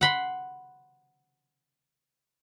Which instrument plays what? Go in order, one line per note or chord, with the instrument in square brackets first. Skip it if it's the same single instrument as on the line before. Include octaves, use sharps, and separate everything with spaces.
[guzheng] F#5 B5 C6